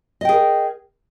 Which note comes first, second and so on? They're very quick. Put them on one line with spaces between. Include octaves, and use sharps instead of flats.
D#5 G5 G#4 A#4